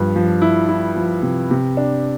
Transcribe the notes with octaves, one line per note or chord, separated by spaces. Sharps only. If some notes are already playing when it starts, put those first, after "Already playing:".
Already playing: G2 F3
F3
E4
E4
F3
C3
C3
D4